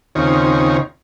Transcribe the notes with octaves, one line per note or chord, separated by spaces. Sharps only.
D#2 C#3 C4 D#4 F4 C#5